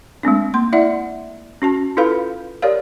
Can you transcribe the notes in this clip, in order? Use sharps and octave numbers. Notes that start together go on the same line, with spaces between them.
G#3 A3 C4 D4
A#3 C6
E4 D5 E5 F#5
C#4 F#4 A5
E4 F4 A4 B4 F5 B5
G4 A#4 C#5 D5 F5